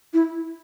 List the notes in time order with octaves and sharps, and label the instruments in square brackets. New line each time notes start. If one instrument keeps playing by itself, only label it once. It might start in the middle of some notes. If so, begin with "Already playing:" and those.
[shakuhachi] E4